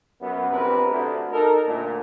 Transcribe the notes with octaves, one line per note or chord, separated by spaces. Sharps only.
F#2 B3
A#1 C3 A#4 B4
D2
D#4 A4 A#4
D2 A#2